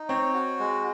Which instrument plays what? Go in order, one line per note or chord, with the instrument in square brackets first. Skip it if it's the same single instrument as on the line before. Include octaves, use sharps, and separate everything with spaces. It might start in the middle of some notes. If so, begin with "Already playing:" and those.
Already playing: [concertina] D#4
[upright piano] C4 [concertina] C#5
[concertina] F#4
G#3